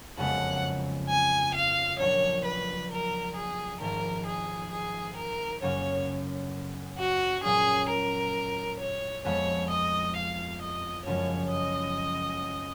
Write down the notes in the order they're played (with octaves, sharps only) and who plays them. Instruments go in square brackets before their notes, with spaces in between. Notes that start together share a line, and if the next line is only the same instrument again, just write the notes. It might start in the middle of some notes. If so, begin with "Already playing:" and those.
[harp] F#1 F2 C#3 G#3 B3 [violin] F#5
[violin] G#5
F5
[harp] A#1 A#2 F#3 A#3 [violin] C#5
[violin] B4
A#4
G#4
[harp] G#1 G#2 F3 [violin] A#4
[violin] G#4
G#4
A#4
[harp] F#2 C#3 F#3 A#3 C#4 [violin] C#5
[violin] F#4
[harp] A#2 F#3 C#4 [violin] G#4
[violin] A#4
C#5
[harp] F2 F3 G#3 B3 [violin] C#5
[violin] D#5
F5
D#5
[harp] F#1 F#2 F3 G#3 [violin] C#5
[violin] D#5